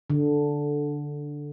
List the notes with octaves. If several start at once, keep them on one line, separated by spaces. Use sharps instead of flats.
D3